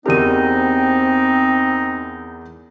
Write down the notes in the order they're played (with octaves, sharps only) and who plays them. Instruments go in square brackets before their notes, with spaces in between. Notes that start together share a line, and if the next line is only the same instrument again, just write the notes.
[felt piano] E2 E4 A#4 [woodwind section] C4 [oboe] D#4 [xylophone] G4 D#7